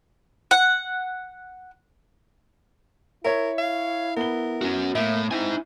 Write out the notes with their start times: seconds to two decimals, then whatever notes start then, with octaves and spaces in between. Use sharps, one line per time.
0.51 F#5
3.25 E4 A#4 C#5 E5
3.59 F5
4.17 B3 A#4 G7
4.62 C#4 F#4
4.95 A2 A#3 E5
5.31 C4 D#4 E4 G#5